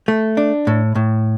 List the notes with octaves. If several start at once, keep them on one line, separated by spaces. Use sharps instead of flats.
A3
D4
A2
A2